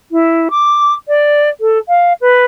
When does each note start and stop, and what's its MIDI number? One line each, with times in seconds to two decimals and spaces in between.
0.11 0.48 64
0.50 0.94 86
1.08 1.49 74
1.60 1.78 69
1.88 2.13 77
2.21 2.45 71